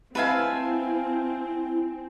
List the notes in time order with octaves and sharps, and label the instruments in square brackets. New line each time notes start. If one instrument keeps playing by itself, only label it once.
[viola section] C4 [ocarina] E4 [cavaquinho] B4 E5 F5 [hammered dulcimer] G#5 A5